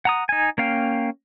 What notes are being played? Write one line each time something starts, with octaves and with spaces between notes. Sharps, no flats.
F#5 A#5 D#6
D#4 G#5
A#3 C#4 F5 G5